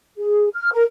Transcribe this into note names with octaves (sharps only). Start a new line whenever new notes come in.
G#4
F6
A#4